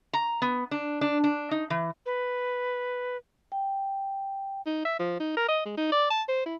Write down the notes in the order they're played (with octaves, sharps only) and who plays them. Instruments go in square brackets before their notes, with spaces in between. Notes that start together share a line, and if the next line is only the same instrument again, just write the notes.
[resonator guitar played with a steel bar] A#5
B3
D4
D4
D4
D#4
E3
[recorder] B4
[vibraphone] G5
[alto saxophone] D#4
E5
F3
D#4
A#4
D#5
G#3
D#4
D5
A5
C5
E4